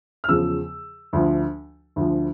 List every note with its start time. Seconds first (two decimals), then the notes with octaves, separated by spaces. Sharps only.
0.24 F6
0.29 E2 C#3 F3 E6
1.13 D2 D3 F3
1.96 D2 D3 F3